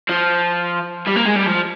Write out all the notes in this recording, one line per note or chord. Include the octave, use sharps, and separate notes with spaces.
F3
G3
A#3
G#3
G3
F3